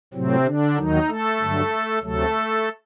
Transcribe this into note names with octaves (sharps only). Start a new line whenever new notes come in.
A2 C3 F#3 C4
D3 D4
D#2 D#3 F#3 D#4
A3 A4
G2 D3 F#3
D2 C3 F#3 A3 A4